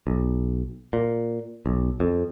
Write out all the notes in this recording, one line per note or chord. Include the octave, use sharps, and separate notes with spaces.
B1
A#2
B1
F2